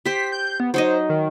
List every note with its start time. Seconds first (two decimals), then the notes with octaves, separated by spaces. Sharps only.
0.05 G4 C5 B6
0.32 G6
0.60 B3
0.74 F#3 D#4 C5 D#5
1.09 D#3